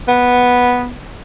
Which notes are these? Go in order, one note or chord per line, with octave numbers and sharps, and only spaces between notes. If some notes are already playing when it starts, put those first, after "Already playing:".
B3